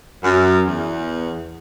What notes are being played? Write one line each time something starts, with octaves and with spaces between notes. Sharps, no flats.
F#2
E2